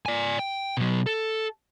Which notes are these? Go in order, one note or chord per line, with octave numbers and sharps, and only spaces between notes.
D5 G#5
G5
B2 F#3
A4